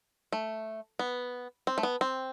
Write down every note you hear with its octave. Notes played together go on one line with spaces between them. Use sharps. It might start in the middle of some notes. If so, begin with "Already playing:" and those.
A3
B3
C4
A3
B3
C4